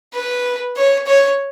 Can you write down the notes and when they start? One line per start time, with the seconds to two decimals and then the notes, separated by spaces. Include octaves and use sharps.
0.14 B4
0.76 C#5
1.06 C#5